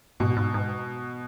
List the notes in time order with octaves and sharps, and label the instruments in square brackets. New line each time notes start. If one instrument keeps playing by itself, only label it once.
[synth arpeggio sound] G#2 [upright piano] B2
[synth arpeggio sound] G#2
G#2